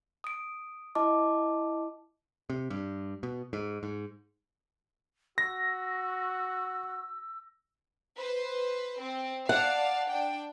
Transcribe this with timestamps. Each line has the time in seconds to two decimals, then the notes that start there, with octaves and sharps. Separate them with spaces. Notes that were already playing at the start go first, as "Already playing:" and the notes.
0.24 D#6 D7
0.95 E4 D#5 A5 D6
2.50 C3
2.70 G2
3.23 B2
3.53 G#2
3.83 G#2
5.38 F#4 E6 A#6
8.17 B4 C5
9.02 C4
9.49 D5 F5 F#5 A5
10.08 D4 G5